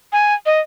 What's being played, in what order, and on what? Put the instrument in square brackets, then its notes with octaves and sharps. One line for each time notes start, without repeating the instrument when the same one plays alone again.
[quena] G#5
D#5